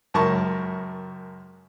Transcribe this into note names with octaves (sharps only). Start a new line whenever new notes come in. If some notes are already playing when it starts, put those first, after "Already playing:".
C#2 F#2 A#4 A5 C#6